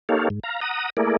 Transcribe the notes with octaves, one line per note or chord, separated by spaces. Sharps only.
A#3 D#4 G4 A4 C#5 F5
G#2
F5 A#5
F#5 A#5 D#6
A3 A#3 E4 G#4 A#4 D5